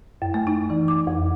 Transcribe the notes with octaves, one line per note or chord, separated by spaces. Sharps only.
F#2
A3
D#4
E3
D6
F2